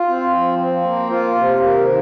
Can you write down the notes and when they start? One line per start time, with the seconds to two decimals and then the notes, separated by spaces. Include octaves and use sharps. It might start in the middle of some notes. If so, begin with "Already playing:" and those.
Already playing: F4
0.08 C4
0.34 F3
0.58 C4
0.84 A#3
1.10 F4
1.35 C3
1.59 A#3
1.84 D#3